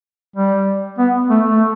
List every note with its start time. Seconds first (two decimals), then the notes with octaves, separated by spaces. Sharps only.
0.36 G3
0.99 B3
1.30 A3
1.50 A3